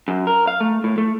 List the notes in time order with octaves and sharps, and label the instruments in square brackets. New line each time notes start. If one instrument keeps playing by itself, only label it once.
[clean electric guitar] F#2
A#4
F5
A3
A2
A3